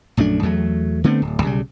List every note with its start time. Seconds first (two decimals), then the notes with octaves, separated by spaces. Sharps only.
0.17 A#1 F#2 A3 D4
0.43 E2 F#3 A3
1.04 D3 A3 B3 C4
1.22 D1
1.42 B1 C#3 G3